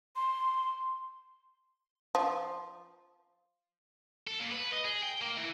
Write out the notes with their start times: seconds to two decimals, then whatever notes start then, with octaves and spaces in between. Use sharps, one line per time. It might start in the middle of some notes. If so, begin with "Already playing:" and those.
0.16 C6
2.15 F3
4.27 A4
4.40 A#2
4.52 B4
4.72 D#5
4.85 G#4
5.03 G5
5.21 A#3
5.37 E3